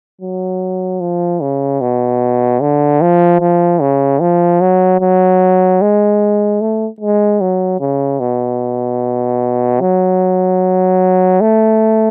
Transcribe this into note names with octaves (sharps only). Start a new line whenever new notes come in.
F#3
F3
C#3
B2
D3
F3
F3
C#3
F3
F#3
F#3
G#3
A3
G#3
F#3
C#3
B2
F#3
A3